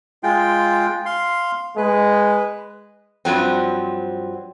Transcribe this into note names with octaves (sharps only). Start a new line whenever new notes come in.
G#3 F4 G5
F5 C6
G#3 B4
G2 F3 F#3 C4